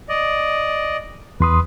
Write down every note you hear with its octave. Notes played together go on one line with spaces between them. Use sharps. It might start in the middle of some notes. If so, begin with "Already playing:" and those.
D5 D#5
E2 B4 C6 D#6